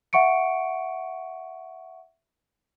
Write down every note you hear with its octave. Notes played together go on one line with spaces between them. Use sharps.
E5 F#5 C#6 C#7 D7